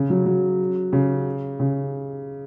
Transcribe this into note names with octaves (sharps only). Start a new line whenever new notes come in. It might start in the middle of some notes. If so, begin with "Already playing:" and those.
Already playing: C#3
F#3
F#3
C#3
C#3